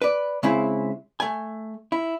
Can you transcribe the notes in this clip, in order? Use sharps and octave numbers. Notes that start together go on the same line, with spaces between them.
B4 D5
C#3 G#3 C4 E4
A3 G#5
E4